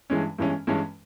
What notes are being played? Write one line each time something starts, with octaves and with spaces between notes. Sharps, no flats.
G2 E3 G#3 C#4
G2 E3 G#3 C#4
G2 E3 G#3 C#4